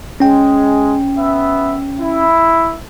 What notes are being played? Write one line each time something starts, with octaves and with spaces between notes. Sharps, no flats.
G#3 C#4 G5
B3 E5
E4